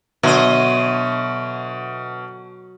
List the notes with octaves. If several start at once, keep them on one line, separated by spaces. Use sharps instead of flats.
B2 D3 F#3 D#5 E5 C6